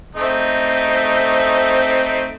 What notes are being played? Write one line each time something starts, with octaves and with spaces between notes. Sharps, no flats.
A3 C4 D#4